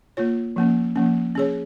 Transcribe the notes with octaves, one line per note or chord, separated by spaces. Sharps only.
A#3 F4 C#5
F3 A#3 C#4
F3 A#3 C#4
C#4 G#4 C#5